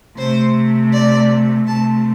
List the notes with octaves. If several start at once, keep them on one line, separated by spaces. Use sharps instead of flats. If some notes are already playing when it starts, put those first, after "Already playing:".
C3 A3 C5
D5
C3 A3 A5